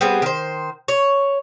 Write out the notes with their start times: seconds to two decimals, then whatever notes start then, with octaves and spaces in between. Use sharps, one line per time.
0.01 G3 B3 C4 G#4
0.22 D#3 C5
0.88 C#5